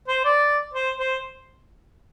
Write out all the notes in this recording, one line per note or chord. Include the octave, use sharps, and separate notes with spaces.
C5
D5
C5
C5